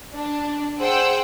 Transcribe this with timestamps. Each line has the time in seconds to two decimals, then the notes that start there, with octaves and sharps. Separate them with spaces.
0.15 D4
0.80 G#4 C5 F#5 G5 E6